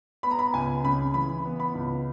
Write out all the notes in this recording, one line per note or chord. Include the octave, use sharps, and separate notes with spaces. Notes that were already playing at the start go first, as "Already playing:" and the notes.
B3 B5
A#5
B5
C#2 G#5
C#3 B5
E3 B5
B3
B5
C#2